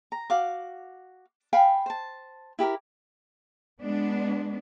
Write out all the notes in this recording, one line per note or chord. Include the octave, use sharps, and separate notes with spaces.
A#5
F#4 F5 D6
F5 G5 G#5 B5
C5 A5
E4 G4 G#4 A#4
G#3 B3 D4